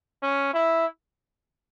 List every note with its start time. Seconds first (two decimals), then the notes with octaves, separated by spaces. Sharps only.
0.23 C#4
0.54 E4